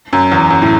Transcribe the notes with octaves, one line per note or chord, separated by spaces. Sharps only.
F#2
E2
F#2
A2